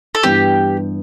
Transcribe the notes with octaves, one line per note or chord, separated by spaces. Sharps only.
A4
G2 E3 B3 G4